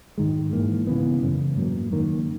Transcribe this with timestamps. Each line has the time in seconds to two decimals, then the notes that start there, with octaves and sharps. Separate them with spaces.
0.18 G#2 D#3 G#3
0.53 G#2 E3 A#3
0.87 C#3 E3 B3
1.22 F#2 C#3 G#3
1.57 G#2 F#3 A#3
1.91 F#2 D#3 A#3